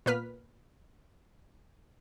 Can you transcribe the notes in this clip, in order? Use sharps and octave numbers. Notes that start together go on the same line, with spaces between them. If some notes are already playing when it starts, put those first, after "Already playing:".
A#2 B3 B4 F6 B6